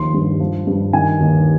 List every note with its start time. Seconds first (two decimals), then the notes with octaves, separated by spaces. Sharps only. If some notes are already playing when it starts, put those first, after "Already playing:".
Already playing: D#2 F3 C6
0.14 G2
0.40 F3
0.67 G2
0.93 D#3 G#5
1.20 D#2